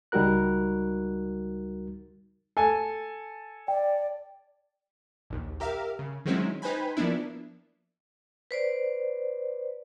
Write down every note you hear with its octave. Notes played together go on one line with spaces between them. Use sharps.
C#2 G3 D#4 F#4 A#4 F#6
A4 G#5
D5 G5
A#1 D#2
G4 A#4 E5 F5
C#3
D#3 F#3 G#3 C4 C#4 E4
D#4 B4 C5 G5 G#5 B5
F3 A#3 B3 D4 E4
B4 C5 D5